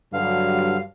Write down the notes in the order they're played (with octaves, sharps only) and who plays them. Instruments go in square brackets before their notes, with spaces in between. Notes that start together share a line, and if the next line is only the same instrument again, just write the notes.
[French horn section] G2 F#3 [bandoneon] D3 F5